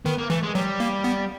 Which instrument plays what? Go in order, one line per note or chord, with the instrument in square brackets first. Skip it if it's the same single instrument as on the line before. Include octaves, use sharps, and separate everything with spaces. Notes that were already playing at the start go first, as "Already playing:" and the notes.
[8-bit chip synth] D#3 [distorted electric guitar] B3
[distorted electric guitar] A#3
[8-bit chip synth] E3 [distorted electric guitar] A3
[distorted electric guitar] G#3
[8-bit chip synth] F#3 [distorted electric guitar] G3
[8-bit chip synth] A#3
B3